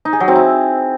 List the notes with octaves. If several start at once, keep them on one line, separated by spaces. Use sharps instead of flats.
D#4
G#4
F#3
C4
E4